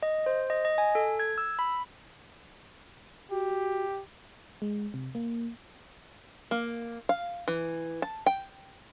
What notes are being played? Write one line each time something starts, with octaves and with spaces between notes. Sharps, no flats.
D#5
C5
D#5
D#5
G#5
A4
G#6
E6
B5
F#4 G4
G#3
C3
A#3
A#3
F5
E3
A5
G5